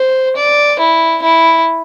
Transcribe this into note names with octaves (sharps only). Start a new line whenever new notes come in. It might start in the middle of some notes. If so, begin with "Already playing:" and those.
Already playing: C5
D5
E4
E4